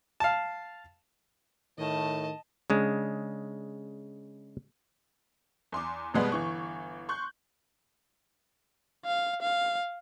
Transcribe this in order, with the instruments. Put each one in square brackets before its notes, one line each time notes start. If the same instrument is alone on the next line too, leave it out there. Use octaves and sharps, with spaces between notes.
[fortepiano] F5 A5
[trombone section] A2 D#3 [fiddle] D#5 A5
[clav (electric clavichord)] C#3 G#3 D4
[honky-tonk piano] E2 C6 D6
G#1 B2 G3 G#3 B3 B4
G1 E3 C#6
C6 C#6 F#6 G6
[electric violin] F5
F5